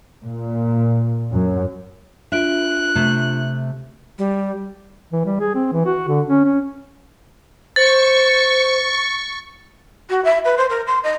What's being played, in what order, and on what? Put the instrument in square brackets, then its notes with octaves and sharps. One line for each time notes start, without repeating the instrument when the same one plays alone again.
[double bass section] A#2
F#2
[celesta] D4 F4 D7 [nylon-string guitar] E5 [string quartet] F#6
[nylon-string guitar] C3 A3
[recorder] G3
[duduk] E3
G3
G#4
C4
E3
F#4
D3
C#4
C#4
[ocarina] C5 [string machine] C#6 [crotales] A6
[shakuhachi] F#4
E5
B4
C5
A#4
C6
D#5